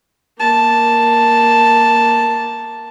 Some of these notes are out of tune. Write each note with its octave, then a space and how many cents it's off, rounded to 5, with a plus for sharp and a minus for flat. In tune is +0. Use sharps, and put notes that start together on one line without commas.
A#3 +5 A5 +0